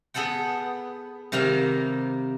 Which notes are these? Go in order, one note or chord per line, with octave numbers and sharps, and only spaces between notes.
B3 G#4 A4 F#5 G5
C3 D#3 G3 A#3 F5 A#5